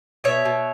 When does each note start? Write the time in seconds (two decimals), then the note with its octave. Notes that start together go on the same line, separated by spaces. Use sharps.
0.24 B2 C#5 E5
0.45 B2